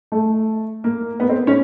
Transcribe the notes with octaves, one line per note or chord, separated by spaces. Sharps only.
A3
A#3
B3
C4
C#4